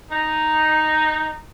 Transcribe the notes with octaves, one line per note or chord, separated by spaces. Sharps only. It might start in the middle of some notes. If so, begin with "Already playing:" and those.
D#4